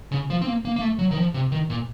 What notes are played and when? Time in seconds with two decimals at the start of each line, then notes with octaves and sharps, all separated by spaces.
0.12 C#3
0.30 F3
0.42 C4
0.46 A#3
0.65 A#3
0.76 A#3
0.81 A3
0.99 F#3
1.11 D#3
1.17 F3
1.34 C3
1.52 D#3
1.70 A#2